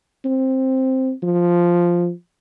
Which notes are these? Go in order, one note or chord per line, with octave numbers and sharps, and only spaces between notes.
C4
F3